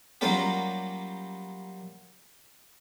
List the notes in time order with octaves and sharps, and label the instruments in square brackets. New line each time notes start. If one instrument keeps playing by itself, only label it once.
[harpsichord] F#3 G3 A#3 C#4 F4 G4